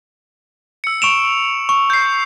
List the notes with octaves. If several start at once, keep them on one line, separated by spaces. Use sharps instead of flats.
E6 C#7
C#6 D7 E7 F7
C#6
G6 C7